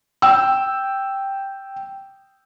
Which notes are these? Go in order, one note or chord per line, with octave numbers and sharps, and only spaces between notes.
G5 E6